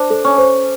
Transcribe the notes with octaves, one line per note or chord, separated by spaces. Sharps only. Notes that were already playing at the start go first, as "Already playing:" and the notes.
Already playing: D4 C5
A4
C#4
C5